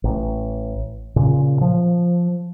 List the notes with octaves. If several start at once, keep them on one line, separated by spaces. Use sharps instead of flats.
A1
A#2 C#3
F3